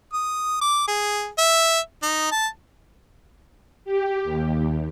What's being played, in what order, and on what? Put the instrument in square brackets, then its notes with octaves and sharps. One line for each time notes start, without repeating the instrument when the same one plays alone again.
[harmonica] D#6
D6
G#4
E5
D#4
A5
[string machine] G4
D#2